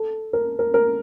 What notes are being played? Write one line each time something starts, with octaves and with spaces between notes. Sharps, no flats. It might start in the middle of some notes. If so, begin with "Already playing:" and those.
Already playing: A4
A#4
A#4
A#4